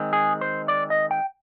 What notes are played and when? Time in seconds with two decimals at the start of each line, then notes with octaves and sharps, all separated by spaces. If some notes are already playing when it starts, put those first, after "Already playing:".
Already playing: D#3 G#3 C4
0.13 G#4
0.41 C5
0.68 D5
0.90 D#5
1.11 G5